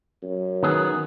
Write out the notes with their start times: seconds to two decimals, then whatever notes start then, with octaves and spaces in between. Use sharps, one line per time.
0.23 F#2
0.63 D#3 B3 G#4